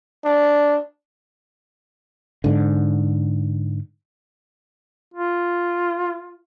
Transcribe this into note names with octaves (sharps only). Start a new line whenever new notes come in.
D4
G#2 D3
F4